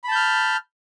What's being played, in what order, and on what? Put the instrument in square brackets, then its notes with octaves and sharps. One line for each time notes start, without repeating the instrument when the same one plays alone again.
[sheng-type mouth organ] B5
A5
G6
F6